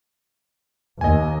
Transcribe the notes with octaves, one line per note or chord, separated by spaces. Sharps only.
D#2 D#5 G#5